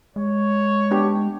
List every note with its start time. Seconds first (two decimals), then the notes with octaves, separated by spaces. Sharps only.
0.16 G#3 C#5
0.91 B3 D4 G4